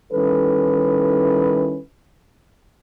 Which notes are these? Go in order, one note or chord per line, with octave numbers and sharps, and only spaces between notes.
D#3 G3 C#4 E4 A4 B4